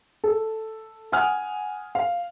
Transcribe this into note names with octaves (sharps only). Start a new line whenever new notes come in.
A4
F#5 G#5 D#6 F6
F5